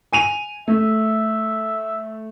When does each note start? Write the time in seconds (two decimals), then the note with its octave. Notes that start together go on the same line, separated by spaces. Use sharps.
0.13 G#5 D#7 F7
0.68 A3 E5